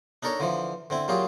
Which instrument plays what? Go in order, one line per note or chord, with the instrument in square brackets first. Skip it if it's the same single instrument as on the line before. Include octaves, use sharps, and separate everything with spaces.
[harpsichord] D4 D#4 A4 A#4 C#5
D3 E3 F3
D3 C4 E4
A#2 F#3 F4 G4 G#4